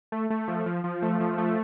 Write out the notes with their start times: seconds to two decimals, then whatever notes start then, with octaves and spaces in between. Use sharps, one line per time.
0.12 A3
0.30 A3
0.48 F3
0.66 F3
0.84 F3
1.02 A3
1.20 F3
1.38 A3